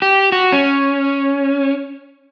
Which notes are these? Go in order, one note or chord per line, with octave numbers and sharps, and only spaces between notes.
G4
F#4
C#4